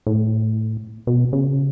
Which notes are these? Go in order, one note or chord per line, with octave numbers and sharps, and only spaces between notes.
A2
B2
C#3